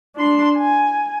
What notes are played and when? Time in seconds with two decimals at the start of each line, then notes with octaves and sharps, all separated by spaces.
0.16 D4 C6
0.58 G#5